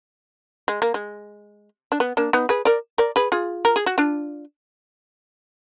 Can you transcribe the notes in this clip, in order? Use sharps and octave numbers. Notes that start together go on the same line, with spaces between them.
G#3
A#3
G#3
D4
B3
A#3 D4
B3 D#4
G#4 B4
A#4 D5
A#4 D5
G#4 B4
F4 G#4
A#4
G#4
F#4
D4 F4